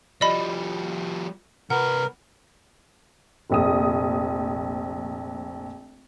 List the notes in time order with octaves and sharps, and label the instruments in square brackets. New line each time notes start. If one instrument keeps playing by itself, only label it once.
[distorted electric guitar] F3 G3 [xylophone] D5 D#5 B5
[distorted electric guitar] C2 B4 [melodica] A#4 [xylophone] F#5
[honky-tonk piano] F1 A#1 D#6